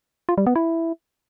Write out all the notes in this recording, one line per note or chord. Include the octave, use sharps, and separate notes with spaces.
F4
G3
B3
E4